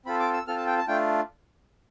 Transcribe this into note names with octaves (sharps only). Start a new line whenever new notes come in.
C4 F4 A4 B5
D6
E6
C4 F4 A4 F6
A5
G5
A5
A3 D4 F4 G5